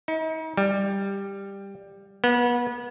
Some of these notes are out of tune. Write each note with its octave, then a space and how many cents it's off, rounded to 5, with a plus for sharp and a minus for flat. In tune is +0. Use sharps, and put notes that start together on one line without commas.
D#4 +40
G3 +10
B3 -30